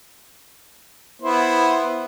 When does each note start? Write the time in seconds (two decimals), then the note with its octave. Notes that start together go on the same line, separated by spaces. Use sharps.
1.22 B3 E4 C5